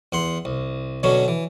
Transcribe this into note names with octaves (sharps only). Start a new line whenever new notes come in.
E2 F#5 C6
C2
B2 D3 F#3 C#4
E3